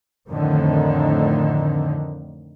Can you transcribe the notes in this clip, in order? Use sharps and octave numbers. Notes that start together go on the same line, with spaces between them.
F2 A2 D3 D#3